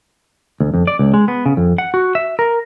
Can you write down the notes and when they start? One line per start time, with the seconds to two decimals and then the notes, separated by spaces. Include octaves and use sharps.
0.60 D2
0.74 F2
0.87 D5
0.99 C#2
1.14 G#3
1.28 B3
1.46 C#3
1.57 F2
1.78 F#5
1.94 F#4
2.15 E5
2.39 A#4